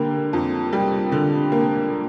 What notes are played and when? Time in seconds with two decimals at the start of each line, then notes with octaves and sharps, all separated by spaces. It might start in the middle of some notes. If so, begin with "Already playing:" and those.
Already playing: D3 G3 A#3
0.33 F2
0.73 G3
1.12 D3
1.52 A#3